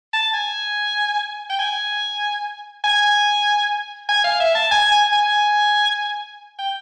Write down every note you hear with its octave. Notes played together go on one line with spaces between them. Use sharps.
A5
G#5
G5
G#5
G#5
G#5
F5
E5
A5
G#5
G#5
G#5
G5